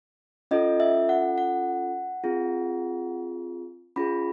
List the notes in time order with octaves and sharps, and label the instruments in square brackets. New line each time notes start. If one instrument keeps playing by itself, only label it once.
[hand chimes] C#4 F4 A4 D#5
E5
F#5
F#5
C4 F4 G#4
C#4 F4 G#4 B5